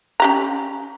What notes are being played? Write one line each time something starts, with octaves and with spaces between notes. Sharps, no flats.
C#4 G4 A#5